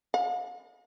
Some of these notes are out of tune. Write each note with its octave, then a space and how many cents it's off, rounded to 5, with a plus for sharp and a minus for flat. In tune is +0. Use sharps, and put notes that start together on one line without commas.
F5 +45